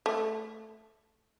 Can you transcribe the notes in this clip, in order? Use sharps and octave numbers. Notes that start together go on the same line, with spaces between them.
A3